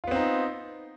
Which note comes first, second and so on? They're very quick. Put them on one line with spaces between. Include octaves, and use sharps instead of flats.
F4 B3 C4 D#4